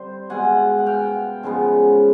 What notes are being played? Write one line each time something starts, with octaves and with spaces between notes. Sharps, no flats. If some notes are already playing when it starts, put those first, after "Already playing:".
Already playing: D3 G3 C4 C5
B2 G#3 B3 F#5 G#5
F#5
F5 G5
C#3 F3 G#3 B3